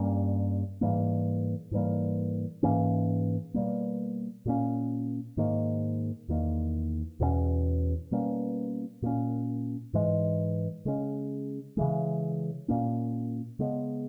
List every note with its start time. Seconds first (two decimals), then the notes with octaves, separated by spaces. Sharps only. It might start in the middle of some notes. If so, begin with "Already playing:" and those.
Already playing: G2 G3 A#3 C#4
0.81 G#2 E3 G3 A#3
1.71 G#2 E3 G3 A#3
2.63 G#2 E3 A#3 C#4
3.54 B2 G3 A#3
4.46 A#2 A#3 C#4
5.37 G#2 D#3 A#3
6.28 E2 D#3 A#3
7.20 E2 B2 A#3 C#4
8.11 B2 G3 A#3 C#4
9.02 A#2 A#3 C#4
9.93 G#2 E3 G#3
10.85 C#3 G#3 C#4
11.77 C#3 E3 G#3
12.68 A#2 A#3 C#4
13.59 C#3 G#3 B3